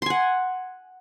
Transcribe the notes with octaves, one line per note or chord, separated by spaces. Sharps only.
F#5 G#5 C6